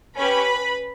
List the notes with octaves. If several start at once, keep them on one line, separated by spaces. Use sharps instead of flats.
C#4 G4 B4 B5